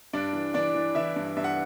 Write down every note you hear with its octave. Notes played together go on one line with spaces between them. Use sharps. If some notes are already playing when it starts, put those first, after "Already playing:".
G2 D4 D5
E3
E3 D4 D5
E3
E3 E4 E5
G2
G2 E5
F#5